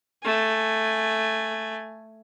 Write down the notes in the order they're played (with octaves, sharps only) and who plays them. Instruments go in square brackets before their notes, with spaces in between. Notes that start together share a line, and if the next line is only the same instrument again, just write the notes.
[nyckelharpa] A3 G#5